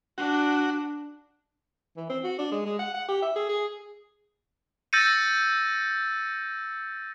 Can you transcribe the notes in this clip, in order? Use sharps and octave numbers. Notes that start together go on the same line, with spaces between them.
D4 F#4
E3
C4
F#4
D4
G#3
G#3
F#5
F#5
G4
E5
G#4
G#4
E6 G6 A6 A#6 C#7 D#7